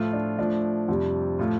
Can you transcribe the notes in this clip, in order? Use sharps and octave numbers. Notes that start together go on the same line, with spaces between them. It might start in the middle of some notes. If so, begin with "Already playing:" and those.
Already playing: A2 F3 A3 F4
D4
A2 F3 A3 D4
F2 C3 G3
A2 F3 A3 F4